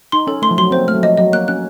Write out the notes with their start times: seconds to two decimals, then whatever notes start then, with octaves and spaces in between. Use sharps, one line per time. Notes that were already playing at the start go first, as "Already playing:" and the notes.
0.12 D#4 C6
0.27 C#4 A4
0.42 A3 C6
0.51 F3
0.58 F#3 C6
0.71 C4 C5
0.78 A#3
0.87 A3 F6
0.95 F#3
1.03 F3 D#5
1.17 F#3 D#5
1.32 A#3 F#6
1.48 C#4 F#6